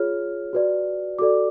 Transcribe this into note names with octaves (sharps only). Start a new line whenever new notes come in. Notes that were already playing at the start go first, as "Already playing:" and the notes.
Already playing: F4 G#4 C#5 F6
F#4 B4 D5
F#4 A4 D5 D6